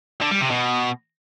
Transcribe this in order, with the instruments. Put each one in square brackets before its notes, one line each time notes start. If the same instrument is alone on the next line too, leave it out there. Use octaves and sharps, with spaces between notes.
[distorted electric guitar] D3
G3
C3
B2